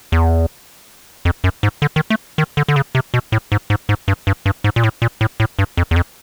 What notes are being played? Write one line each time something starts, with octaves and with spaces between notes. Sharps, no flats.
E2
F2
F#2
G#2
D3
D#3
A3
D#3
D3
D3
C#3
C3
B2
A2
G#2
G#2
G#2
G2
G2
G2
G#2
A#2
A2
A#2
A2
A2
G2
F2
E2
F2